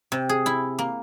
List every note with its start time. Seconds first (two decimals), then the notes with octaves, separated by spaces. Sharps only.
0.12 C3
0.29 G#4
0.46 E4
0.79 A#3